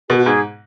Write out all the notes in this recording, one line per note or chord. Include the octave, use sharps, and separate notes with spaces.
B2 G#4
F#4
G#2 G#4